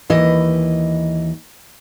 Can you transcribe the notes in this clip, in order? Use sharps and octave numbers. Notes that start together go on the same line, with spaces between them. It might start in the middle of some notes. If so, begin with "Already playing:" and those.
D#2 E3 D#5